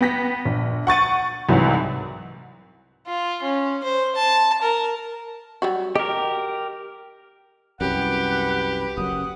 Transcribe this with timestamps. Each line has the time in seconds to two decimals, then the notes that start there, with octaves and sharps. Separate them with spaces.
0.01 B3 G5 A#6 B6
0.45 A#1
0.87 F#5 C#6 A6 D#7
1.49 C2 G#2 E3 F#3
3.06 F4
3.42 C#4
3.83 C5
4.15 A5
4.61 A#4
5.62 F#3 G3 F#4
5.96 G4 A#4 D#5
7.81 C2 F#2 G4 B4 F#5
8.98 F#1 F#2 F#5 D#6